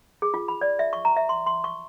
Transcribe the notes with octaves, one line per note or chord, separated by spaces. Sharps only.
G#4
F4
B5
D5
E5
C#6
A#5
E5
C6
C6
C#6